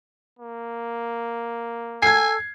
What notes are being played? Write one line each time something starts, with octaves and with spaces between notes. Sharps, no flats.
A#3
A4 G#5 G#6 C7